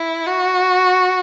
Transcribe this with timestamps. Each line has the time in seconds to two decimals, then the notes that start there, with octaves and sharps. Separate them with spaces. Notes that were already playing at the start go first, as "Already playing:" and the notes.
Already playing: E4
0.27 F#4